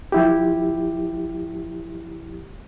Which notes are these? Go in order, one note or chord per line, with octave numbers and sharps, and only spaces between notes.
F3 E4 G4